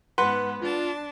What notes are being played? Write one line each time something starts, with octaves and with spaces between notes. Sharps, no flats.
G#2 B3 B4 F#5 C6
D4 F4 A5